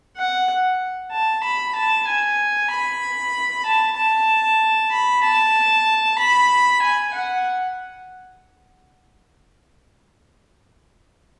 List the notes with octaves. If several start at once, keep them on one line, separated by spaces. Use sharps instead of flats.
F#5
A5
B5
A5
G#5
B5
A5
A5
B5
A5
B5
G#5
F#5